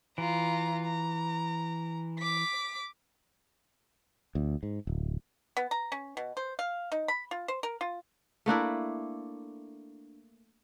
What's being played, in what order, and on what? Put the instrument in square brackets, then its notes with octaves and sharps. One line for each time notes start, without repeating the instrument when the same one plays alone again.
[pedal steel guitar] E3 [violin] F4 A#5
[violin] A#5
D6 B6
[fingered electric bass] D2
G#2
D1
[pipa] B3
A#5
C#4
B2
C5
F5
D#4
B5
F4
C5
A#4
F4
[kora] A3 A#3 D4 E4